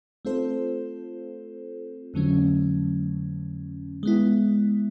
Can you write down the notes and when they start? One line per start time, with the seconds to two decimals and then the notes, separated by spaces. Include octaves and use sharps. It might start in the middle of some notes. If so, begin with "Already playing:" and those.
0.25 A3 C4 F4 A4 C5
2.14 F2 D3 F#3 A3 C#4
4.03 G#3 B3 E4